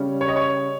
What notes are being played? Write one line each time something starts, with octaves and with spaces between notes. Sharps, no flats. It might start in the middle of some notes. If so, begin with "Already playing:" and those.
Already playing: C#3 G3 C#4
C#5
D#5
C#5